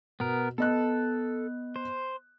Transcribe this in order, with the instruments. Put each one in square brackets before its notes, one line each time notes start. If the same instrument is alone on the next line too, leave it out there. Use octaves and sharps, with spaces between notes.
[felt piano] B2 [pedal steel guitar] B3 A#4
[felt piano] B3 D#5 F#6 [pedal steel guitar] A4
[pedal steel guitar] C5